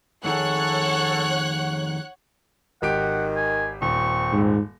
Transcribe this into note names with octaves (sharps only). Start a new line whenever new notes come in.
F2 D#3 G#4 A4 C#5 F#5 C#6 F#6
G#1 D#3 G4 F#5 D7
G#5
D#1 C4 C#6
G#2